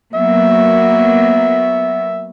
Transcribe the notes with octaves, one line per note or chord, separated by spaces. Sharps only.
F#3 A#3 B3 E5